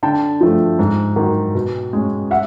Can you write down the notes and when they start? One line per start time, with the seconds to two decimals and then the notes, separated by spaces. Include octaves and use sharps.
0.03 D3 G5 A5
0.41 F3 A3
0.79 G#2
1.16 D#3 F#3
1.55 B2
1.93 G#3 C#4
2.31 E5 F#5